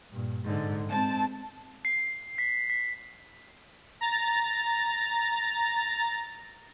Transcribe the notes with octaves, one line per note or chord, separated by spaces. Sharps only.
G2 A#2
G#2 D3
G#3 C4 A5
C7
B6
B6
A#5 A6